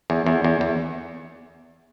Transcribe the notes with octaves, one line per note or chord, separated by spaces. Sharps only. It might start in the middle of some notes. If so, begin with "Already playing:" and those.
E2
E2
E2
E2